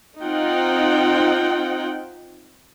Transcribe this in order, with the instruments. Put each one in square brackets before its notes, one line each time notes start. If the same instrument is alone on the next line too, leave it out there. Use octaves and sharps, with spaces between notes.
[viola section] C4 D#4 F4 F#5 G5